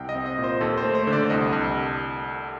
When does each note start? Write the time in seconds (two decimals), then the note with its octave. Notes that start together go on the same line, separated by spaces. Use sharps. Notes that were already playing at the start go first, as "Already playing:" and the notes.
Already playing: C2 G5
0.09 D#5
0.15 C4
0.26 D#5
0.38 A#2
0.44 C5
0.61 D#2 A4
0.77 C5
0.84 A3
0.95 C5
1.07 D3
1.13 D5
1.30 C2 D#5
1.53 C2